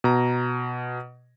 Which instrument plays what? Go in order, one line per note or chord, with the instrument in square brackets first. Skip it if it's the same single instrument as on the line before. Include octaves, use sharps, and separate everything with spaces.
[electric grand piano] B2 A#5